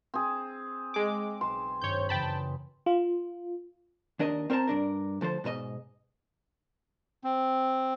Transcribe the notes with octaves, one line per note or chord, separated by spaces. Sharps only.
C4 G#4
G#3 D6
B1 C6 E7
G#1 G2 C#5 G6
F#2 C#3 E3 G5 A5 B5
F4
D#2 D4 A#4 D#5
C4 A#4 C5 C#5 A5 A#5
G2 D4 A#4
D2 F3 A4 C5
G#2 B2 B4 D#5
C4